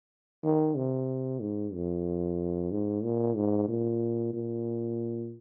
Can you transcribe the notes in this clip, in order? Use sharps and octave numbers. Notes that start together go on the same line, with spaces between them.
D#3
C3
G#2
F2
G#2
A#2
G#2
A#2
A#2